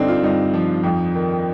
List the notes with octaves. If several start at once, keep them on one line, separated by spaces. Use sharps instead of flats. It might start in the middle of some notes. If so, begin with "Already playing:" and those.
Already playing: G2 D3 C4 D4 D#4
F4
G2 D#4
F3
F2
D#3